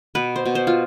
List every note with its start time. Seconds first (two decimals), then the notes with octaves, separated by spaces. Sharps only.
0.15 B2 B4
0.36 C5
0.46 B2
0.55 C5
0.67 F4